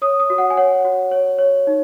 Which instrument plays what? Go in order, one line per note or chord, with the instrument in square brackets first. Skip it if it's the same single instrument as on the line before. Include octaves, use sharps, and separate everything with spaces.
[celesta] C#5 D#6
D#6
F#4
F#5
G#5
C#5 F#5
F#4
C#5
C#5
D#4